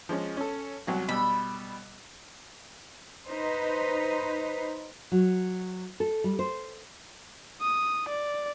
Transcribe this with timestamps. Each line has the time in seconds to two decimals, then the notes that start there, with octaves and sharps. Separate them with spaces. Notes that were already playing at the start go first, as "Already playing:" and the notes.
0.09 F3 G#3 C#4
0.37 C#4 A4
0.87 C2 F#3 F#4
1.09 B2 G3 B5 E6
3.28 D#4 B4 C5
5.12 F#3
6.00 A4
6.24 G3
6.39 C5
7.61 D#6
8.09 D5